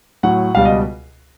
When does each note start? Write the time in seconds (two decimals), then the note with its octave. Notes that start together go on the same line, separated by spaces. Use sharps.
0.23 A2 F#3 F#5
0.55 C#2 B2 G3 F5
0.65 D#5